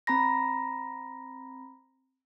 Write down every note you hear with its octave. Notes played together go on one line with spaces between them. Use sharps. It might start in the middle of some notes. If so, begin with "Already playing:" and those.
C4 A#5 B5 A#6